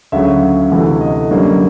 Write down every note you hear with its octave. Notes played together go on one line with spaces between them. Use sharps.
D2 C#3 F#3 E5
D2 C3 E3 A3
D#5
F#2 D3 G3 A#3